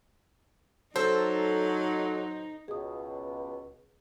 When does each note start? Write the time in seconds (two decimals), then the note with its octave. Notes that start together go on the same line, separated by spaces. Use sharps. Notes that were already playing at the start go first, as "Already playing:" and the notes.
0.96 F#3 D#4 A4 C5
2.68 C#2 B2 G#4 D#6